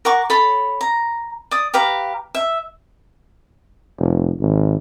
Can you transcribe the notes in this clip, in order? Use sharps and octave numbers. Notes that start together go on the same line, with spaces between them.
A#4 F#5 C#6 D6
A4 C#5 B5
A#5
D5 D#6
G4 B4 F5 A#5
E5
F1
G#1